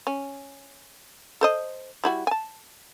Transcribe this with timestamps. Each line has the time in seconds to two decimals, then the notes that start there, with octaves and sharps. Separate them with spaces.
0.07 C#4
1.41 A4 C5 D#5
2.04 G3 E4 F#4
2.27 G#5 A5